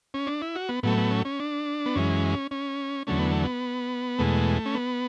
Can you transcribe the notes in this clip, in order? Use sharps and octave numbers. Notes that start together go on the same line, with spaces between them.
C#4
D4
E4
F#4
B3
A2 F#3 A3 B3
B3
C#4
C#4
D4
B3
F#2 E3 G#3 C#4
C#4
E2 D3 F#3 A3 C#4
B3
A3
B3
E2 B2 G#3 A3
C#4
B3